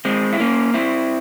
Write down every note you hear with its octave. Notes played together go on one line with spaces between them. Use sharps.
G#3 C4
E4
A#3 C#4
C4 E4